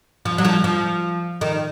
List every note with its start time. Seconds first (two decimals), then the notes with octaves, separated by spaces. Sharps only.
0.25 F3
0.38 F#3
0.45 F3
0.64 F3
1.41 D#3